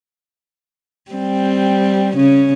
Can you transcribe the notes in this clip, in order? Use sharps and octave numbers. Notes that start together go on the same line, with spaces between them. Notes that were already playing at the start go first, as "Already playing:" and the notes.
G3 C4
C#3 C#4